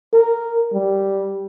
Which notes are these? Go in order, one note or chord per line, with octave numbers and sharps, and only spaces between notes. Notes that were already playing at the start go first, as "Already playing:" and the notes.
A#4
G3